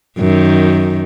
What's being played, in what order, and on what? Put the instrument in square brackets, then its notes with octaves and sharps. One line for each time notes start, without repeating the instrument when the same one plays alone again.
[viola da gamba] F#2 D#3